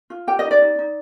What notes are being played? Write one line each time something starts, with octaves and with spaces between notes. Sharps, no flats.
F4
G4 G5
D#5
D#4
D5
D#4
D#4